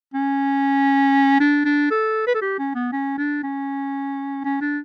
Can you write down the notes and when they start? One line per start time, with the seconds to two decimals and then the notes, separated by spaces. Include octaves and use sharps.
0.14 C#4
1.40 D4
1.65 D4
1.91 A4
2.27 B4
2.35 A4
2.42 G4
2.59 C#4
2.75 B3
2.93 C#4
3.18 D4
3.43 C#4
4.44 C#4
4.61 D4